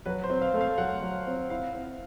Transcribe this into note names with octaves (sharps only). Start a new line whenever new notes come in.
F#3 B4
C5
C4
F5
A3
F5
F#3 F#5
F#3
C4
E4 F5
C4